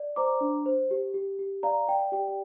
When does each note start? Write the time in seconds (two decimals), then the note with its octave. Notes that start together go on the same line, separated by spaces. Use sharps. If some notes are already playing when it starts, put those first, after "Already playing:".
Already playing: D5
0.16 C5 A#5 D6
0.41 D4
0.66 C5
0.91 G4
1.14 G4
1.39 G4
1.63 D5 F5 A#5
1.87 D5 G5
2.12 G4 G5
2.28 G5